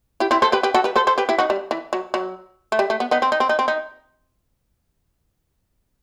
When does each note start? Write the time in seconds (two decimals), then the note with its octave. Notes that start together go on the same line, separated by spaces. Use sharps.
0.20 E4 G4
0.31 C4 E4
0.42 A4 C5
0.52 G4 B4
0.63 G4 B4
0.74 F#4 A4
0.84 G4 B4
0.96 A4 C5
1.07 A4 C5
1.18 G4 B4
1.29 E4 G4
1.38 D#4 F#4
1.50 G3
1.71 E3
1.93 F#3
2.14 F#3
2.72 A3
2.79 G3
2.90 A3
3.00 B3
3.11 B3 D#4
3.22 C4
3.32 D#4
3.40 C4
3.49 D#4
3.59 C4
3.68 D#4